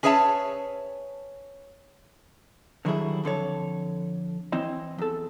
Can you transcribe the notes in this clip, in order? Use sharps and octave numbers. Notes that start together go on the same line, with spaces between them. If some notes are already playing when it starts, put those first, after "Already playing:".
C#4 G#4 B4 C#5 E5 A5
D3 D#3 F#3 G3 E4 G#4
F2 D3 A4 C#5
E3 C4 E4 D#5
E2 A4